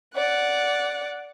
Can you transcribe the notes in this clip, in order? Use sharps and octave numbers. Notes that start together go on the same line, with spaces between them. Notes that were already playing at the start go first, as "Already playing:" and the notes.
D5 F#5